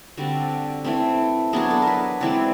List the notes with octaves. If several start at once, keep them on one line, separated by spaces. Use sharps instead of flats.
D3 G3 C4 F#4
E3 A3 C4
F#3 B3 D4 G#4
A4
A#4
B4
E3 G#3 C4 D5